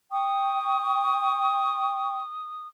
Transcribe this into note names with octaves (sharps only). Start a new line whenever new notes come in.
G5 C#6 D#6